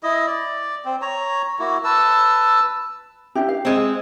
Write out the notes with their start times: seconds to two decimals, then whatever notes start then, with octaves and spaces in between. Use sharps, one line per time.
0.03 E4 D#5
0.27 D5
0.85 C4
1.02 C#5 A#5
1.59 A#3 E4 F#4
1.84 B4 A5 E6
3.35 D4 E4 G4
3.48 F5
3.65 G#3 C4